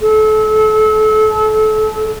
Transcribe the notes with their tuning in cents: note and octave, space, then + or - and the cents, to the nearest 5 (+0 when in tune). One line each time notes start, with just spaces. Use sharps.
A4 -30